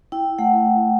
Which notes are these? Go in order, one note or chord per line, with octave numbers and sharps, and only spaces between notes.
E4 G5
A3 F#5